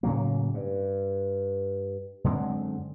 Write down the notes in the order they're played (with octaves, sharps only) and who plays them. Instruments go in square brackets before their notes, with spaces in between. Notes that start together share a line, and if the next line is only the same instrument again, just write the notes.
[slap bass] A2 C#3 F#3 A#3
G2
F#2 D3 G#3 C4